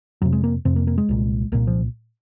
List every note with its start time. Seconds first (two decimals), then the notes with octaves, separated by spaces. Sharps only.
0.22 F2 C3 F#3
0.33 G#3
0.44 A#3
0.65 F2 C3 C4
0.76 A#3
0.87 A#3
0.98 G#3
1.09 C2 A#2
1.52 C2 A#2 A#3
1.67 F3